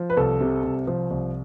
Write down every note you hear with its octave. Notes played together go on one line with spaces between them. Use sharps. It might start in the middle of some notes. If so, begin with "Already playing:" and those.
Already playing: F3
B4
C2 A4
C3
C2
F3
C2